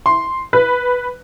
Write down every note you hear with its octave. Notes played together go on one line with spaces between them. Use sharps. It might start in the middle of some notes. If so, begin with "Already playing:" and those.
C6
B4